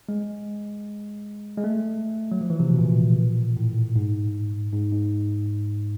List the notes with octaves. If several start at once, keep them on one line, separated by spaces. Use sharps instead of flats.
G#3
G#3
A3
F#3
F3
E3
C3
B2
A#2
A2
G#2
G#2
G#2